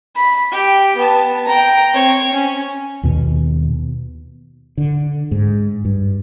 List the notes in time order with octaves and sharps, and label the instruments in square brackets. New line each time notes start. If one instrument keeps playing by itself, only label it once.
[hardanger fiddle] B5
G4 G5
B3 A5
G5 A#5
C4 C#5
C#4
[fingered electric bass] D#2 B2
[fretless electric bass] D3
G#2
G2